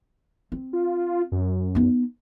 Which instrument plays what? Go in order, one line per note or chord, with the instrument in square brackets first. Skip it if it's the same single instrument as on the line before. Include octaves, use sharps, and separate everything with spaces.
[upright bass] C4
[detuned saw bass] F4
F#2
[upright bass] B3 D#4